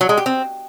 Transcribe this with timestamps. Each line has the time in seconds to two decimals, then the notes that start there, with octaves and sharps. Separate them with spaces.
0.01 F#3
0.09 G#3
0.17 G4
0.26 C4